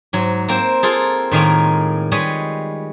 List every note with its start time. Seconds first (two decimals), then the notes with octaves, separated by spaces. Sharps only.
0.13 G#2 F#3
0.48 A#3 C4 C5
0.83 A#3 F4 G#4 A4
1.31 A2 D#3 G#3 A#3
2.12 G3 G#3 B4 C#5 D#5